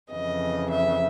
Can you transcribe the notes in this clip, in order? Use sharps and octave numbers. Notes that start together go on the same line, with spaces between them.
F2 C#3 E3 D#5
E5